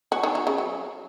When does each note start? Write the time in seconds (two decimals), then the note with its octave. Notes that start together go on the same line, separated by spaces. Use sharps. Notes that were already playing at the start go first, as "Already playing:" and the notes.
0.12 F#4
0.23 D#3
0.35 F#4
0.47 C#3
0.58 F#3